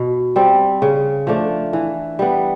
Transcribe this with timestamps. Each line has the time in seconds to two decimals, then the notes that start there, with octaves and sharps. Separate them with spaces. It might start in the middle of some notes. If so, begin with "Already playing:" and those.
Already playing: B2
0.36 G3 C4
0.82 C#3
1.27 F3 A3 D4
1.73 E3
2.19 G3 B3